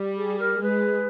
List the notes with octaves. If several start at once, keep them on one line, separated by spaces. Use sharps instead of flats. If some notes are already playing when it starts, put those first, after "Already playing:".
Already playing: G3
G#4
A#4
G#3 B4